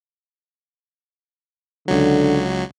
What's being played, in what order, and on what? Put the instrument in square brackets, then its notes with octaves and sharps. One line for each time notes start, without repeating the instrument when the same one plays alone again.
[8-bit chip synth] C#2 F#3 [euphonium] D3